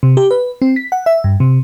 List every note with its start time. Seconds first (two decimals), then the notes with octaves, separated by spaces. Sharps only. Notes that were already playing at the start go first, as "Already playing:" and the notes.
0.03 C3
0.17 G4
0.31 B4
0.62 C4
0.76 B6
0.92 F#5
1.06 E5
1.24 G2
1.40 C3